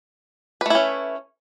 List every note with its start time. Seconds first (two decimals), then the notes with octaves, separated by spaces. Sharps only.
0.61 B4
0.66 A3
0.70 E4
0.75 C#4